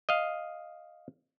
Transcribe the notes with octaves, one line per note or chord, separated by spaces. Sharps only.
D#5 F5